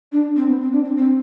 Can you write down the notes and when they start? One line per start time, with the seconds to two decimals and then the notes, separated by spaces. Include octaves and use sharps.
0.12 D4
0.36 C4
0.48 B3
0.60 C4
0.72 D4
0.84 C4
0.97 C4